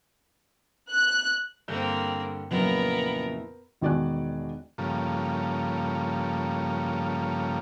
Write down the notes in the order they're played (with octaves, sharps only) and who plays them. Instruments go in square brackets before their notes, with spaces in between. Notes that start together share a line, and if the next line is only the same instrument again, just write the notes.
[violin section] F#6
[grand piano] G2 D3 G6 [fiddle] A#3 C4
[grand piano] F2 A#2 [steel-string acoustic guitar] C#3 F#3 E4 [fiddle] B3 A#4
[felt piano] E1 D#3 F#4 D5 G#5 F#6
[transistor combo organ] G2 C#3 F3 A3 A#3